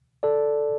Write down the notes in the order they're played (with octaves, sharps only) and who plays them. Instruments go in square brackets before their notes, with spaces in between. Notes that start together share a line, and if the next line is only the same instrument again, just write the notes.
[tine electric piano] A4 D5